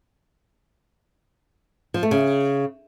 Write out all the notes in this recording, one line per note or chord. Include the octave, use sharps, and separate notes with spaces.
F3
A3
C#3